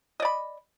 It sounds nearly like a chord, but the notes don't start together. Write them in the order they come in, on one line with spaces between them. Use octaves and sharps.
D#5 D5 B5